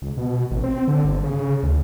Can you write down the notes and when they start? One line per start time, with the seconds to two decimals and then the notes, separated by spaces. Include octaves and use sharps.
0.02 C#2
0.17 B2
0.51 A1
0.64 C4
0.88 D3
1.05 G1
1.24 C#3
1.63 D2